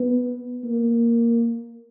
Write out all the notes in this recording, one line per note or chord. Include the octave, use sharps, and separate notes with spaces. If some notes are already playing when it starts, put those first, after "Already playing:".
Already playing: B3
A#3